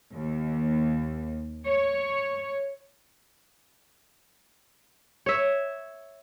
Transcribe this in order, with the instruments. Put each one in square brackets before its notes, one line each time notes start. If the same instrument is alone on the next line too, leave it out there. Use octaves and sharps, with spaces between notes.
[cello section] D#2
C#5
[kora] C#5 E5